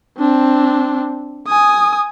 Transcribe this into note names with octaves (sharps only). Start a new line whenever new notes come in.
C4 D4
G#5 D#6